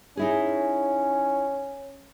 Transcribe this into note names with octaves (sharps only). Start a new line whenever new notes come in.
C#4 D#4 E4 G#4